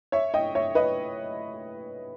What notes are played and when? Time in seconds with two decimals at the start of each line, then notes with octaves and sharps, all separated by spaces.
0.12 C#5 E5
0.34 D#5 G5
0.55 C#5 E5
0.75 B4 D#5